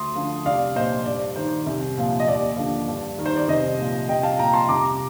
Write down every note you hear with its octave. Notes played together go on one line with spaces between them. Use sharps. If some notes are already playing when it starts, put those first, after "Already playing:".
Already playing: D2 C6 D#6
D3 F3
C2 D5 F5
A#2 F3 C5 D#5
G2 D5
D#3 C5
C2
A#2 F3
D#5
D#2 D5
D3 F3
G2
D#3
C5
D5
C2 C5 D#5
A#2 F3
C2 D#5 G5
F5 A5
A#2 F3 G5 A#5
A5 C6
C2 A#5 D6